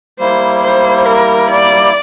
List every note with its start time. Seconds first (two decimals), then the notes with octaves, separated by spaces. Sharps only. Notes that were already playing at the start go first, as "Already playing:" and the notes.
0.19 G3 A#3 E4 C5
0.63 C5
1.06 A#4
1.50 D5